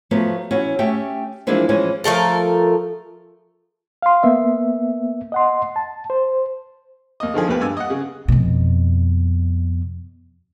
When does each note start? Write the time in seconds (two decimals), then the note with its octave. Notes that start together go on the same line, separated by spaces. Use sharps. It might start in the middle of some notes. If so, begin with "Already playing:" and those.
0.11 F3 F#3 A3 B3 F4
0.51 E3 C#4 F#4
0.79 A3 C#4 G4 E5 G5
1.47 E3 F3 G#3 A#3 D4 E4
1.69 E3 F3 G#3 C#4
2.04 F3 A3 A4 A#4
4.02 F5 C6
4.23 A#3 B3 E5
5.32 D#5 F#5 C6
5.76 A5
6.10 C5
7.20 D#2 D#5
7.34 D3 D#3 F3 G#4
7.48 D#2 B2 G4 B4
7.61 G2 G#5 E6
7.77 D#5 F#5
7.90 C#3
8.28 F2 B2